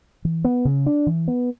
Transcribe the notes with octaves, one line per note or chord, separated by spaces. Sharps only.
E3
B3
C#3
D4
E3
B3